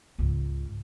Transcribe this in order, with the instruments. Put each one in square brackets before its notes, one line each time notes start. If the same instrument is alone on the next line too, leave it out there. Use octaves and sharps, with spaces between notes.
[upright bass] C#2 G#2